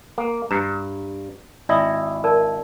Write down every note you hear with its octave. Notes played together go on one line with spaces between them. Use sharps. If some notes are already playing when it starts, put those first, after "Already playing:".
A#3
G2 A#5
G#1 E4 D5 D#5
A#4 D5 A5